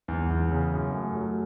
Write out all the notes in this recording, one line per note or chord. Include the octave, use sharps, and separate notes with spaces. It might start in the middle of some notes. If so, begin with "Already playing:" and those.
E2
E2
C#3
F#2
A3
F#3